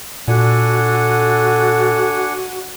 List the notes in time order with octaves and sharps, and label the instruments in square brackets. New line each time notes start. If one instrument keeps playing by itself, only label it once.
[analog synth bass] A#2 [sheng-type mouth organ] D4 F#5 G#5 [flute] F#4 [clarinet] A4